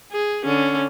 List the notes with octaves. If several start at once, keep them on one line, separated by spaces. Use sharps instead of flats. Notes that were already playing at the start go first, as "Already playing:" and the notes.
G#4
D3 C#4